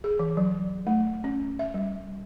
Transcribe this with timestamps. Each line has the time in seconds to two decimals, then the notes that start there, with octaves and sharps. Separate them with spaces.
0.04 G#4
0.19 E3
0.37 F#3
0.87 A3
1.24 C#4
1.59 E5
1.74 G3